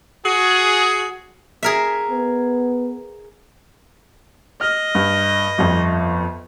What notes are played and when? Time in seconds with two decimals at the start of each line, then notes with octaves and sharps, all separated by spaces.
0.25 F#4 G#4
1.63 G#4 A#4 E5
2.11 B3
4.61 D#5 F6
4.95 G2
5.58 G1 F2